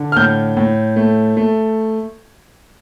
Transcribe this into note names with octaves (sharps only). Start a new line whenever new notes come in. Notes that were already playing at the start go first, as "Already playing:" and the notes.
Already playing: D3
F6
A2 G6
A2
A3
A3